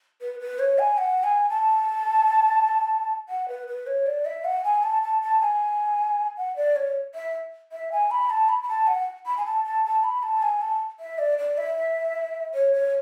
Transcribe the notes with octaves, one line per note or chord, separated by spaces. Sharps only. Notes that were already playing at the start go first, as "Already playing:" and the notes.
B4
B4
C#5
G#5
F#5
G#5
A5
F#5
B4
B4
C#5
D5
E5
F#5
G#5
A5
A5
A5
G#5
F#5
D5
C#5
E5
E5
G#5
B5
A5
B5
B5
A5
F#5
B5
G#5
A5
A5
A5
B5
A5
G#5
A5
E5
D5
D5
E5
C#5
C#5